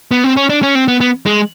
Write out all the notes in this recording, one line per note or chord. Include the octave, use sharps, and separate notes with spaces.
B3
C4
C#4
D4
C#4
C4
B3
B3
G#3